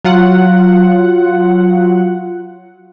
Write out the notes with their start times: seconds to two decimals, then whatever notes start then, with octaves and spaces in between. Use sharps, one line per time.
0.04 F#3 F4 F#5